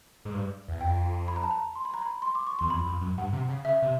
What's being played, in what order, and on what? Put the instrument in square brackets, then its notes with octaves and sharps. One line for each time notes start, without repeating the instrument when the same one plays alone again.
[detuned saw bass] G#2
G2
E2
[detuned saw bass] F2 [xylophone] G5
[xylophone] B5
A#5
A5
A#5
C6
B5
A#5
B5
C6
D6
C#6
[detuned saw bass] E2 [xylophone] C6
[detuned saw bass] F2 [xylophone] B5
[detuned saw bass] F2
F#2
[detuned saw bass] G2 [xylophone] F#5
[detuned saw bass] C3
C#3
[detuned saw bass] C#3 [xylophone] E5
[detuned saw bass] C3